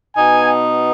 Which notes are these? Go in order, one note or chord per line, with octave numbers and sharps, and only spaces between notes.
B2 B3 D#4 G#5